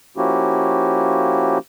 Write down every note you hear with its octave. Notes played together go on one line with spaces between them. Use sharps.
F3 A#3 C#4 E4 F#4 G4